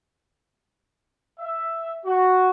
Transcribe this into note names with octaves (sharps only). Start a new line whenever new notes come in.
E5
F#4